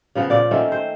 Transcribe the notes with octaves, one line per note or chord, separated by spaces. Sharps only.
C#3 F3 B3
A#2 D5
D#3 A3 C4 C#4
C5